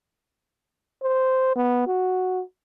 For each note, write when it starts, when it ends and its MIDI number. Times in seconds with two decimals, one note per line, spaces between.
1.02 1.54 72
1.56 1.87 59
1.87 2.42 66